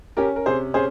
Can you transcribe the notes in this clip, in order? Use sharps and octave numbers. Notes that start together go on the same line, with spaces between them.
C#4 G4 A#4
A#4
C3 G#4 C5
C#4 G#4 C5